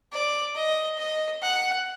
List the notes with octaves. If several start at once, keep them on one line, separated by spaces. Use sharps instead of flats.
D5
D#5
D#5
F#5